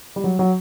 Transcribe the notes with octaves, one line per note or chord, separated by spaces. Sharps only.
G3
F#3
F#3